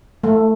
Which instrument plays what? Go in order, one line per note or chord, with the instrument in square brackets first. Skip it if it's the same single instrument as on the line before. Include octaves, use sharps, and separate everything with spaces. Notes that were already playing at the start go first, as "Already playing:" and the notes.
[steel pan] A3